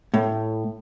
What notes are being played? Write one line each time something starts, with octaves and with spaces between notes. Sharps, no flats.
A2